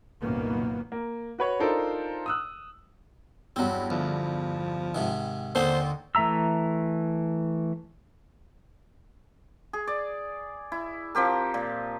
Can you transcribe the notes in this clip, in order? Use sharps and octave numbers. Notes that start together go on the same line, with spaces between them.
C2 F#2 A#2 D#3 A#3 B3
A#3
F#4 B4 C#5
D4 D#4 F4 A4 A#4 C5
D#6 E6 F#6
E2 G2 F#3 C4
D2 F3
G#2 C3 D#3
D#2 D3 C4 D#4 C5
E3 A3 E5 A#5 E6
G#4
D5
E4
F3 C4 G4 A#4
A#2